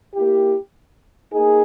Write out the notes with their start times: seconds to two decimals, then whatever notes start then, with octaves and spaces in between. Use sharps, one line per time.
0.14 A#3 E4 G4
1.33 A#3 D#4 G#4